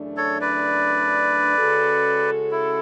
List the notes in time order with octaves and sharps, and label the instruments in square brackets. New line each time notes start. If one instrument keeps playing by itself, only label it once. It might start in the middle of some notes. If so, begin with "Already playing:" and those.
Already playing: [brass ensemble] F#2 C#3 E3 A3 D4
[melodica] A4 C#5
B4 D5
[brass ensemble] C#3 G#3 C#4 F#4 A4
[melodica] E4